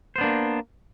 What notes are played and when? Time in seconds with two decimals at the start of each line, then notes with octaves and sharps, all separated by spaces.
0.16 C5
0.18 B3
0.21 D4
0.24 A#3